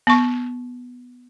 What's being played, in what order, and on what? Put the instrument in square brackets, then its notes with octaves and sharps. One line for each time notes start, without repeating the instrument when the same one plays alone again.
[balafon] B3 C#6